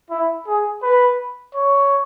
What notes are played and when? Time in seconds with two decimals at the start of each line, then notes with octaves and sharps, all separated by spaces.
0.10 E4
0.47 G#4
0.83 B4
1.55 C#5